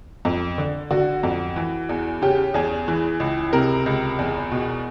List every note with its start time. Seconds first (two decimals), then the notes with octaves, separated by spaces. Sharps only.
0.25 F2
0.58 D3
0.91 D3 F#4
1.23 F2
1.56 E3
1.89 E2
2.22 C#3 G4
2.54 E2 G#4
2.88 E3
3.20 C#2
3.53 C3 A#4
3.86 C#2
4.19 E2
4.51 B2